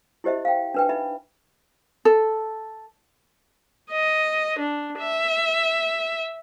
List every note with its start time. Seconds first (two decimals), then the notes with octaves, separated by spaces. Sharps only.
0.24 E4 G4 C5 D#5 E5
0.45 F5 G5
0.74 D4 B4 G5
0.89 D#4 E5 B5
2.05 A4
3.91 D#5
4.59 D4
4.99 E5